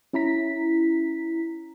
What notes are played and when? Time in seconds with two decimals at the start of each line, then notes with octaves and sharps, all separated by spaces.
0.13 C#4 E4 A#5 B6